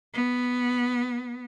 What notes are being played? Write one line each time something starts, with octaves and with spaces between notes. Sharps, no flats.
B3